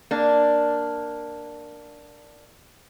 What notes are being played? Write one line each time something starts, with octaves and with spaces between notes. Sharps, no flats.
A#3 D4